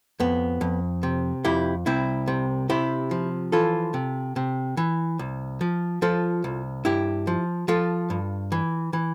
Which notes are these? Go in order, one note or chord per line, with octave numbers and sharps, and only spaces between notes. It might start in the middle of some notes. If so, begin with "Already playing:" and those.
F2 B3
F2
C3
F2 E4 G4
C2 C4 E4
C3
C3 E4 G4
F3
E3 F4 A4
C3
C3
E3
C2
F3
F3 F4 A4
C2
G2 E4 G4
F3
F3 F4 A4
G2
E3
E3